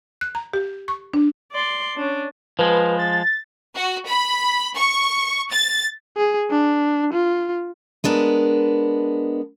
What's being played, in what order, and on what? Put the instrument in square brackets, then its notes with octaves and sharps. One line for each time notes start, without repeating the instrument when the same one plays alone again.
[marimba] F#6
A#5
G4
C#6
D4
[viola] D5 C6
C#4 D4
[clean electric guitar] F3 G#3 [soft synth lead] B4
[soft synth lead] A6
[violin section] F#4
B5
C#6
A6
[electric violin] G#4
D4
F4
[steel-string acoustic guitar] G#3 B3 D4 A#4